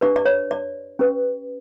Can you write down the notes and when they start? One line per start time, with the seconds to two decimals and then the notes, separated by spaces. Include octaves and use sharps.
0.01 D4 G4 B4 D5
0.16 D5
0.25 C#5
0.51 D5
0.99 C#4 G4 B4